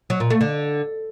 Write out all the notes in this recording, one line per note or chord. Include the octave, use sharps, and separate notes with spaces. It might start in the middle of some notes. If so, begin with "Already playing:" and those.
F#3
A#2
A3
D3